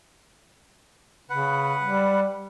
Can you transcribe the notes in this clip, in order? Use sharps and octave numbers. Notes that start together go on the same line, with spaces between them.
C#3 B4 F#5
G3